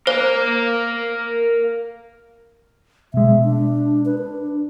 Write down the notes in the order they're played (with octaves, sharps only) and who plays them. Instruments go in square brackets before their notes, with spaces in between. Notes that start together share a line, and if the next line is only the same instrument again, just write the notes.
[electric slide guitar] A#4 F5 [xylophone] C5
[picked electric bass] B2 G#3 [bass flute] E5
[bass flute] D4
B4
D4